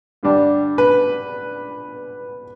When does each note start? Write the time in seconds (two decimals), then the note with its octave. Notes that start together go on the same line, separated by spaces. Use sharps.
0.23 G2 D3 G3 D4
0.78 B4